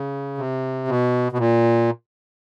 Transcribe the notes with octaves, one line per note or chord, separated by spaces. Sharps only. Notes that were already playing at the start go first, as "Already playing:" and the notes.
Already playing: C#3
C3
B2
B2
A#2